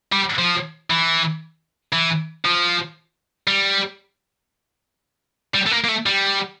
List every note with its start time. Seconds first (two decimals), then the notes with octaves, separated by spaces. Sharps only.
0.12 G3
0.38 F3
0.90 E3
1.93 E3
2.45 F3
3.48 G3
5.55 G3
5.67 A3
5.72 A#3
5.84 A#3
5.89 A3
6.06 G3